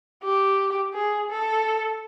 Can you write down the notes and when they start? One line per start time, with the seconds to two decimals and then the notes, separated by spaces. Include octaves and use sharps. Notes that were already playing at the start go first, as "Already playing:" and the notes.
0.23 G4
0.94 G#4
1.30 A4